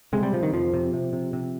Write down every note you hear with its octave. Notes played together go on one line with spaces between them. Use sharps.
C3 G#3
G3
C3 F3
D#3
F2 F3
C3
C3
C3
C3